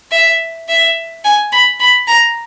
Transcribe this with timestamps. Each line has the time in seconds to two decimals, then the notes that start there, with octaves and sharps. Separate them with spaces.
0.12 E5
0.69 E5
1.25 G#5
1.52 B5
1.80 B5
2.08 A#5